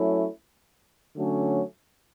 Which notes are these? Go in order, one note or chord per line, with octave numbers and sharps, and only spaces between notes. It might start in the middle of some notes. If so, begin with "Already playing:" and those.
Already playing: F#3 A3 C#4 E4
D3 F#3 A3 C#4